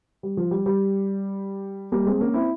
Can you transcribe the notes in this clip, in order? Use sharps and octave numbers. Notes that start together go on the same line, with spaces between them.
G3
F3
G3
G3
G3 A#3
G#3 C4
A#3 C#4
C4 E4